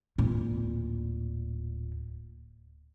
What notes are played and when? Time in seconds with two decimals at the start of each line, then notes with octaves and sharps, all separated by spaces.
0.18 D1 A#2